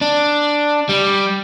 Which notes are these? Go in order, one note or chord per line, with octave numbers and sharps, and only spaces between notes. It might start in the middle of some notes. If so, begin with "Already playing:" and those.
D4
G3